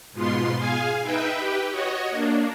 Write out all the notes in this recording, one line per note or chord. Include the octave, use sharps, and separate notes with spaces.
G#2 B2 B3 F4 C6
G#4 F5 G#5
D#4 B4 E5 G5
G4 B4
F#4 C#5 D#5
A#3 D4